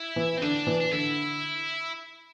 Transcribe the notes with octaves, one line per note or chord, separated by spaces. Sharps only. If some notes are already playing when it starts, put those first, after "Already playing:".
Already playing: E4
E3
C4
D3 D4
E3
D4
D3 E4